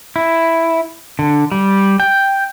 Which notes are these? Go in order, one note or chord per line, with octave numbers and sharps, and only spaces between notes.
E4
D3
G3
G5